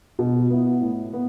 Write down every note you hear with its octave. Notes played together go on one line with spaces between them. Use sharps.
B2
B3 E4
A2
B3